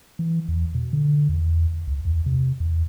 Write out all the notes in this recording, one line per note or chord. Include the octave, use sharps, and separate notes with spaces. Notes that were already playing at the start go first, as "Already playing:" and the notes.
E3
E2
B2
D3
E2
C#2
E2
C3
E2